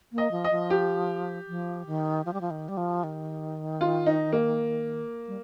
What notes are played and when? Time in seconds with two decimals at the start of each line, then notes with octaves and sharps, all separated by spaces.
0.12 A#3
0.18 D#5
0.31 F3
0.44 D#5
0.51 F3
0.70 G4
1.48 F3
1.87 D#3
2.25 F3
2.33 G3
2.41 F3
2.51 D#3
2.69 G3
2.77 F3
3.04 D#3
3.81 F4
4.06 D#4
4.33 A#3
5.28 G3